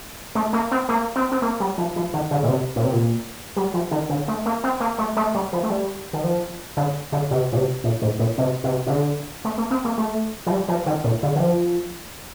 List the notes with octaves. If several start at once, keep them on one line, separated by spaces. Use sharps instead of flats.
A3
A#3
C4
A#3
C4
C4
A#3
G3
F3
F3
D#3
D3
A#2
C3
A#2
C3
A#2
G3
F3
D#3
D3
A3
A#3
C4
A#3
A3
A3
G3
F3
A3
G3
D#3
F3
D3
D3
C3
A#2
C3
A#2
A2
A#2
C3
C3
C3
D3
A3
A#3
C4
A#3
A3
F3
G3
F3
D#3
A#2
D3
D#3
F3